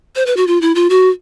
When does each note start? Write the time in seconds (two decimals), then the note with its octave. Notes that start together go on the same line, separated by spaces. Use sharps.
0.16 C5
0.26 B4
0.37 F#4
0.47 F4
0.61 E4
0.75 F4
0.90 F#4